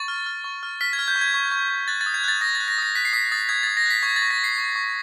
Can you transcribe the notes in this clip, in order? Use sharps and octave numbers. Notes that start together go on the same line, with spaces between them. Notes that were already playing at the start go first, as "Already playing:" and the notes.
Already playing: C#6 A6
F6
F6
C#6
F6
F6 B6
G#6
F6
G6
C#6
G#6
C#6
C#6
C#6
F#6 A6
A6
D#6
G#6
F#6 A6
D#6 A#6
A6
F#6
A#6
D#6 A#6
F#6 B6
C7
D#6 B6
D#6 A6
D#6 G#6
D#6 A6
A#6
F#6 B6
C#6 G#6
A6
C#6
A#6
C#6
C7
C#6
C#6